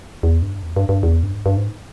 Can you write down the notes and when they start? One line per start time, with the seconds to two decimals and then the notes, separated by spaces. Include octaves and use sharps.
0.23 E2
0.42 G2
0.63 E2
0.76 G2
0.89 G2
1.03 E2
1.23 G2
1.34 G#2
1.46 G2
1.57 G#2